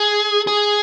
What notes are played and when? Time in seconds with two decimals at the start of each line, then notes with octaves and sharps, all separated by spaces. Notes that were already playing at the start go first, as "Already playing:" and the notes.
Already playing: G#4
0.47 G#4